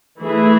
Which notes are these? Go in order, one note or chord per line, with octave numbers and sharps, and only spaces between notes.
E3 A3 E4 G#4